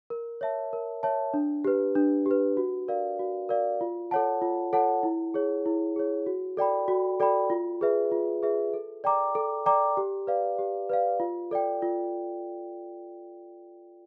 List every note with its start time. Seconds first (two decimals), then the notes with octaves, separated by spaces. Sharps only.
0.10 A#4
0.41 C#5 E5 A5
0.73 A#4
1.03 C#5 E5 A5
1.34 D4
1.65 G4 B4
1.95 D4
2.26 G4 B4
2.57 F#4
2.88 A#4 D5 F5
3.19 F#4
3.49 A#4 D5 F5
3.81 F4
4.11 A4 C#5 F#5 A5
4.42 F4
4.73 A4 C#5 F#5 A5
5.03 E4
5.34 G#4 C#5
5.66 E4
5.96 G#4 C#5
6.26 F#4
6.57 A4 D5 G5 B5
6.88 F#4
7.20 A4 D5 G5 B5
7.50 F4
7.81 G#4 B4 E5
8.12 F4
8.43 G#4 B4 E5
8.74 A4
9.04 D5 G5 A#5 D6
9.35 A4
9.66 D5 G5 A#5 D6
9.97 G4
10.27 B4 D5 F5
10.59 G4
10.89 B4 D5 F5
11.20 F4
11.51 A4 D5 G5
11.82 F4